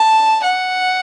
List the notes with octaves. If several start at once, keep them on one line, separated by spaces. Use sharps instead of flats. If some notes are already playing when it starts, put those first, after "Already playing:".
Already playing: A5
F#5